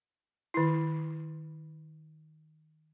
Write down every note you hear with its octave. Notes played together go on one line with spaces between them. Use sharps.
D#3 E4